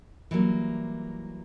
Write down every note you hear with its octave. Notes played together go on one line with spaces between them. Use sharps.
E3 F#3 G3 A#3